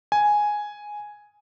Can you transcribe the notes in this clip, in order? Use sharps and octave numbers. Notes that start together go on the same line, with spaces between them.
G#5